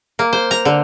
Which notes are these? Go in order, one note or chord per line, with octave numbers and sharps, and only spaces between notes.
A#3
C5
A#5
D3